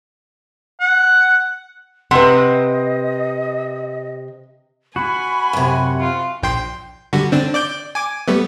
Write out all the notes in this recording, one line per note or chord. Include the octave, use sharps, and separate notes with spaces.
F#5
C3 B4 D#5 F#5 C6
F#4 G#5 B5
F#2 C3
F4
A#1 G5 C6
D3 G3 F#4
D3 C4 D4
D5 D6 G6
G#5 D6
G3 A3 B3